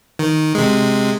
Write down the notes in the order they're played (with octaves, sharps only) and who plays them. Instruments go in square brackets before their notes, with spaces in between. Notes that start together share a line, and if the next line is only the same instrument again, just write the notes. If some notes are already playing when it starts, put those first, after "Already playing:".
[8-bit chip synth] D#3
C3 G#3